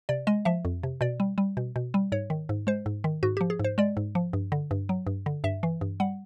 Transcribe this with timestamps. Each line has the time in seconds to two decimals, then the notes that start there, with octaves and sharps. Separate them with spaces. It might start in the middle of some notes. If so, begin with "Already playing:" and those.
0.09 C3 D5
0.27 G#3 D#5
0.45 F3 E5
0.65 F2
0.83 C3
1.01 B2 D5
1.20 G3
1.38 G3
1.57 B2
1.76 B2
1.94 G3
2.12 G#2 C#5
2.30 D#3
2.49 G#2
2.67 G#3 C5
2.86 G#2
3.04 D#3
3.23 G#2 F#4
3.37 F3 G4
3.50 G#4
3.59 G#2 C5
3.78 G#3 D5
3.97 G#2
4.15 F3
4.33 G2
4.52 D3
4.71 G2
4.89 F#3
5.07 G2
5.26 D3
5.44 G2 E5
5.63 E3
5.81 G2
6.00 G3 F#5